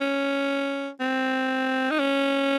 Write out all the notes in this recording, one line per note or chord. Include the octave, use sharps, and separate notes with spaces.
C#4
C4
D#4
C#4